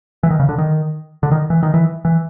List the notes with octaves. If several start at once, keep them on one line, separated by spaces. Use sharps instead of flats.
E3
D#3
C#3
D3
D#3
D3
D#3
E3
D#3
E3
E3